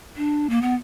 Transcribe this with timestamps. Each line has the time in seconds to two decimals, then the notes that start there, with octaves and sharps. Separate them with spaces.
0.17 D4
0.50 A#3
0.62 B3